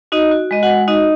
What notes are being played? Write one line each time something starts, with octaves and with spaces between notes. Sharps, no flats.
D#4 F#4 D#5
F#4
G#3 D#5
F#4 F#5
G#3
D#4 F#4 D#5